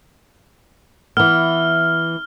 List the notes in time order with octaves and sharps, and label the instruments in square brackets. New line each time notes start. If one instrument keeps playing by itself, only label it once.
[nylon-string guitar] E3 B3 [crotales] F6